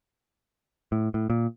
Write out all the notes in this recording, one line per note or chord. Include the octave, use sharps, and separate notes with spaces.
A2
A2
A#2